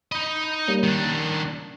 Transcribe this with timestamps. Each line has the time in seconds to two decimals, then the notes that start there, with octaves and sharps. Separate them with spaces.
0.12 D#4 D#5 B5
0.68 G3 A#3 C#4
0.83 D#3 D4